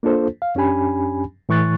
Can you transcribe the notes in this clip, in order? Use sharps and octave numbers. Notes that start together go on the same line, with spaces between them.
A#3 D4 F4 A4 C5
F5
F#2 C#4 D4 G4 G#5 B5
A2 E3 C#6 F#6 A6